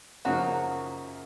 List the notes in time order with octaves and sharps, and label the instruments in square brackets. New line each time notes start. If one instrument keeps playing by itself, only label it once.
[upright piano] F#2 C#3 F3 A#3 D#4 [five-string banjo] F#3 F#4